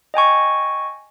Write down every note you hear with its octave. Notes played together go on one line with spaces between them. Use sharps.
D#5 G5 G#5 C#6